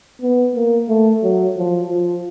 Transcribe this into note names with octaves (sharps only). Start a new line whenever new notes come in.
B3
A#3
A3
F#3
F3
F3